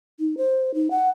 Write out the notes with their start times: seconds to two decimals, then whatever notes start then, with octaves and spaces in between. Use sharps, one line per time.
0.20 D#4
0.37 C5
0.74 D#4
0.91 F#5